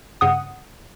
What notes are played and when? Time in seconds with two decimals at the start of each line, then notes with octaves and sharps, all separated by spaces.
0.21 G2 C#3 F#5 D#6